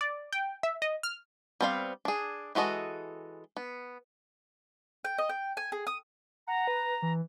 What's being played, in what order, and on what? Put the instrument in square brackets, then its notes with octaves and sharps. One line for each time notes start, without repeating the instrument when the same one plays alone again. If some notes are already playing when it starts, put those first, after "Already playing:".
[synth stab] D5
G5
E5
D#5
F6
[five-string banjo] G3 B3 C4 D#4 F5
D4 G#4
E3 G#3 F#4 A4 D#5
B3
[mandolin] G5
D#5
G5
G#5
G#4
D#6
[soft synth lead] F#5 [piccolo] A#5
[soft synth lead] B4
E3